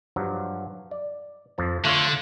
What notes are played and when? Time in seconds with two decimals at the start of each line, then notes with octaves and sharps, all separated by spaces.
0.16 G2 F3 F#3
0.91 D5
1.58 F2 F3 A5
1.85 D3 A3 F4 C#5